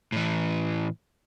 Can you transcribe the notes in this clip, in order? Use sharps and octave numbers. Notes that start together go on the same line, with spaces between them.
A2 E3